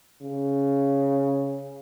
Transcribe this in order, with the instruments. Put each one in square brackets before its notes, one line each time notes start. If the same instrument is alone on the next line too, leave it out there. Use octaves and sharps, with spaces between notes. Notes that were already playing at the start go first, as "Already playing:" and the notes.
[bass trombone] C#3